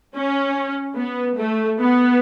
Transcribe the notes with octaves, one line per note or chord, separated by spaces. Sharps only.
C#4
B3
A3
B3